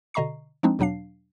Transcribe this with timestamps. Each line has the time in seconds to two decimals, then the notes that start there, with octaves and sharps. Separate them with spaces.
0.14 B2 D3 D#5 A#5 C#6 C7
0.63 F3 G#3 C4 D4 D#4
0.79 E2 B2 F#3 D4 F5 C7